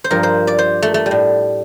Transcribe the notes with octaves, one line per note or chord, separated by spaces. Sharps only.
C5
G2 F3 A#4
C5
D5
C5
A3
A3
G3
A2